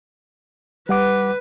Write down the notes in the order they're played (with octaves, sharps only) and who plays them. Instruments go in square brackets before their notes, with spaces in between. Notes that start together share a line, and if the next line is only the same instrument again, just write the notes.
[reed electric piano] G3 F#5 D6 [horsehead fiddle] B4